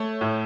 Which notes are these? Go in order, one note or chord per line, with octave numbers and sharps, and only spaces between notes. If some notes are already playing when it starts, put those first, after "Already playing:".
Already playing: A3 C#5
A2